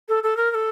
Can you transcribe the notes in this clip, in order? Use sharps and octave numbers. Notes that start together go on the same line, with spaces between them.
A4
A4
A#4
A#4
A4